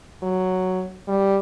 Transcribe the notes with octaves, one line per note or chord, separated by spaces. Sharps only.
F#3
G3